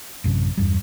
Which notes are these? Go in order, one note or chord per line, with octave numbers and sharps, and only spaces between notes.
A1 F#2 C3
E2 G2 G3